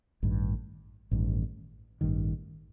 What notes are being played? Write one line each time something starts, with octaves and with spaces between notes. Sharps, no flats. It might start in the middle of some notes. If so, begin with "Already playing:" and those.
A1 G2 D#3
A1 G2 D#3
A1 G2 D#3